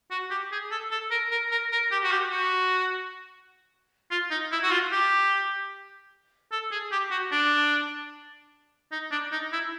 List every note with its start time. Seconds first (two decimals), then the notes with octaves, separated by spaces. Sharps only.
0.11 F#4
0.31 G4
0.52 G#4
0.71 A4
0.91 A4
1.11 A#4
1.31 A#4
1.51 A#4
1.72 A#4
1.92 G4
2.04 F#4
2.12 G4
2.31 F#4
4.11 F4
4.31 D#4
4.52 E4
4.64 F#4
4.72 F4
4.92 G4
6.52 A4
6.72 G#4
6.92 G4
7.11 F#4
7.32 D4
8.92 D#4
9.11 D4
9.32 D#4
9.52 E4